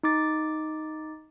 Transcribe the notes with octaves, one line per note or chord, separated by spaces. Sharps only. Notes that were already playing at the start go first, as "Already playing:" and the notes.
D#4 D6 A6